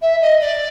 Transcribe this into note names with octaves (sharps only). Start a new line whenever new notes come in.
E5
D#5
D5